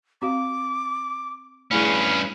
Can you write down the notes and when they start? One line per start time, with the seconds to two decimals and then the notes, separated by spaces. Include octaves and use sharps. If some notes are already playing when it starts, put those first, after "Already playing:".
0.22 C4 F#4 F5 D6
1.71 G2 A3 C#4 E4 G#4 B5